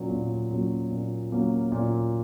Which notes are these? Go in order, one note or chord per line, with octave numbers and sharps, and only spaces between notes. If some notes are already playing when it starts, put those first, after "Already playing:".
Already playing: A#2 F#3 A#3 C#4
A#2
F#3 A#3 C#4
A#2
F#3 A#3 C#4
A#2